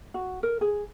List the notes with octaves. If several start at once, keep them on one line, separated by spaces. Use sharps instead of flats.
F#4
A#4
G#4